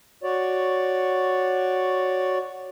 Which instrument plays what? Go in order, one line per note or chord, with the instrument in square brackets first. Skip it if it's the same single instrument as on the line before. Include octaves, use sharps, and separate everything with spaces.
[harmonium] F#4 C#5 D5